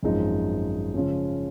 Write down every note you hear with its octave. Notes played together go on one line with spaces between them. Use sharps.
G#1 F#2 F3 G#3 D#4
C#3 F3 G#3 C#4